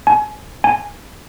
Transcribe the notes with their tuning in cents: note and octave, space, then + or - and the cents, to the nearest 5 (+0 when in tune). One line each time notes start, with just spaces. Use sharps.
G#5 +25
G#5 -10